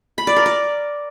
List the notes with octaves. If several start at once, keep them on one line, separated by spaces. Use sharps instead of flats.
B5
D5
A#4
D5